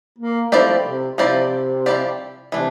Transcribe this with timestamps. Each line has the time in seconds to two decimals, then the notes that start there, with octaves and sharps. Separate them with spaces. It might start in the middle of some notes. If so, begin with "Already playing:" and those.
0.18 A#3
0.52 F3 A3 C4 E4 G4 D5
0.85 C3
1.18 C3 F3 C4 E4 G4 D5
1.86 F3 C4 E4 G4 D5
2.52 C3 E3 A3 D4